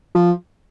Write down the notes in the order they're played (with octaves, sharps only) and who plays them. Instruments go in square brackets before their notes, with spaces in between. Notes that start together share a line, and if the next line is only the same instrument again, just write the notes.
[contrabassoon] F3